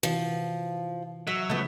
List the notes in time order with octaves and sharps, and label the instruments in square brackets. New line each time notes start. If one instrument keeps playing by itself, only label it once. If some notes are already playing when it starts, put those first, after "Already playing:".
[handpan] C3 E3 F#4 [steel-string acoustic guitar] F3
[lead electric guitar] F#3 [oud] E5
[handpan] C#3 F3 [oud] A3 B3